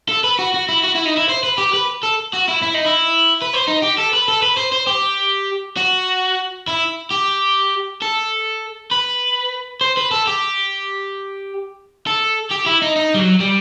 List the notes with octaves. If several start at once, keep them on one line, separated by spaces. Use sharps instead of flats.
A4
B4
F#4
F#4
E4
F#4
E4
D#4
E4
C5
B4
G4
B4
A4
F#4
E4
E4
D#4
E4
B4
C5
D#4
G4
A4
B4
A4
B4
C5
C5
G4
F#4
E4
G4
A4
B4
C5
B4
A4
G4
A4
G4
E4
D#4
D#4
G3
F#3
G3